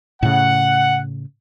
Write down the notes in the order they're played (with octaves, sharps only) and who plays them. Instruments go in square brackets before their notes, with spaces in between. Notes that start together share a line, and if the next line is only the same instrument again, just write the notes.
[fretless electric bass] A2 C#3 [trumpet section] F#5